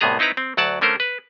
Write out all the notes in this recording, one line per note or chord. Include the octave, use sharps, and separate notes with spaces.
C2 A2 C3 B3 G#4 A#5
C4 D#4 E4 B4 A#5
C4
D2 F#3 D5 F#5 A5
D3 A3 C#4 A#4 C5
B4